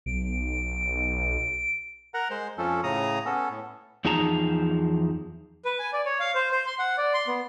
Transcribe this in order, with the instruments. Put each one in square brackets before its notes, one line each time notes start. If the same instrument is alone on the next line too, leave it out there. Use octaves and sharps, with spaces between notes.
[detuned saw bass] B1 [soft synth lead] D7
[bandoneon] A#4 F#5 A#5
G#3 C5 C6
F2 F3 C#4 A4
A2 C#3 A#5 D#6
B3 C#4 A4
A2
[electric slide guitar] E2 F3 D#4 G#4 A5 A#5
[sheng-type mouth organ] B4
G#5
D5
C#5
F5
C5
C5
C6
F#5
D5
C6
B3